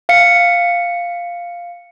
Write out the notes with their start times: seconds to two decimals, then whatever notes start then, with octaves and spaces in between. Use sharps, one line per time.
0.09 F5 C#7